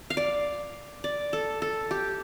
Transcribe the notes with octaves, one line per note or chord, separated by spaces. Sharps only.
F5
D5
D5
A4
A4
G4